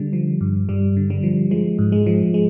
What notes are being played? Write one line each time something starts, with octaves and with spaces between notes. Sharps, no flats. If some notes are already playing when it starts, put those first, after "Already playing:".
Already playing: D3 G3
F3
G2
G2 G3
D3
G3
F3
F3 G#3
G#2
G#3
F3
G#3